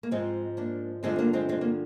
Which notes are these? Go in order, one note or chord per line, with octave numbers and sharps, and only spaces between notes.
A#3
G#2 F3 G#3 C4
A#3 D4
G2 D3 F3 G#3 C4
A#3 D4
G#3 C4
G#3 C4
A#3